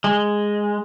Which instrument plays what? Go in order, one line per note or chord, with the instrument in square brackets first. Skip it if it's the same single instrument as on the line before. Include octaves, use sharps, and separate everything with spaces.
[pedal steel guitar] G#3